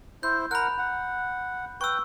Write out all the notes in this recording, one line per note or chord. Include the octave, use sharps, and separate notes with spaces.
E4 C5 G6
A#4 F#5 B5 F#6
F#5
B4 G5 C#6 E6